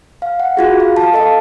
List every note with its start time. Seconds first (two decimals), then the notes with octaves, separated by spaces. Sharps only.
0.22 F5
0.40 F#5
0.57 F4 F#4 G#4
0.80 F5
0.96 F5 A5
1.14 A4 D#5 F5 A5